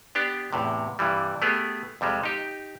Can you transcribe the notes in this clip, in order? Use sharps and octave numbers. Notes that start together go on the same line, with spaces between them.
B3 D4 G4
E2 A2 C3
G2 C3 E3 G3
A3 B3 G4 G#4
F2 C3 G3 G#3
D#4 G4